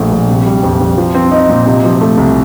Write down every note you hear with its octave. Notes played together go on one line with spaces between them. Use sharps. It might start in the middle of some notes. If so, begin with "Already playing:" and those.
Already playing: A#1 A#2 A3
A#1
C3
G3
F2
F2
F3
C4
D#4
A#2
C3
F3
A3
C2